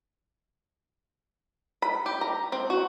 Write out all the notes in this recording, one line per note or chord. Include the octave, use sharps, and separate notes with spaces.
B5
G4
A#5
C4
F#4